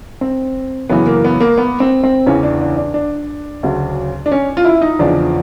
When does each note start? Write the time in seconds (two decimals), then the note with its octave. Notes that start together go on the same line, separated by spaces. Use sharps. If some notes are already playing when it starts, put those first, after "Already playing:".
0.21 C4
0.89 F#2 C#3 E3 B3
1.07 A#3
1.24 B3
1.40 A#3
1.58 B3
1.80 C4
2.03 C4
2.26 E2 C#3 E3 C#4
2.43 D4
2.61 D4
2.77 D4
2.94 D4
3.63 D2 C#3 F#3
4.26 D4
4.32 C#4
4.57 F4
4.65 E4
4.81 D#4
4.99 E2 C#3 F3 D4